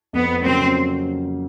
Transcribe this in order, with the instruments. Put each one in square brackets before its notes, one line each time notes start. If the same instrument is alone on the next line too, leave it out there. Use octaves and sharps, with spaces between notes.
[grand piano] F2 [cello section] B3
[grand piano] C#3 F#3 A#3 C#4 [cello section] C4